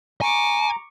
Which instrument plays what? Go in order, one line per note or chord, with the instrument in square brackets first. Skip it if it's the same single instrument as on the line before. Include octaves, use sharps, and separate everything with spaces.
[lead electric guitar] G#5 [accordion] A#5 [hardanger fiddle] C#6 D6